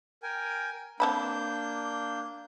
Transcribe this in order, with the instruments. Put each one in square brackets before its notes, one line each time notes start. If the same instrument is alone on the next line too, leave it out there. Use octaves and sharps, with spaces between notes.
[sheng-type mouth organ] A#4 G5 G#5
[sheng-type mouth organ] A#3 D4 G6 [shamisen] C4 A5 B5